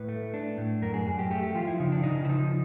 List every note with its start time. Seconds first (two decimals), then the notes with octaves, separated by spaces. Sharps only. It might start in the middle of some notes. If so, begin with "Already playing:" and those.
Already playing: A2 B4
0.09 A3
0.34 D4
0.58 A2
0.82 F#2 A#4
0.94 G#4
1.06 F#2 G#4
1.19 G4
1.31 A3 G4
1.43 G4
1.55 F3 F4
1.67 E4
1.80 C#3 D#4
1.92 D4
2.03 C#3 D#4
2.25 E4
2.29 F3 D#4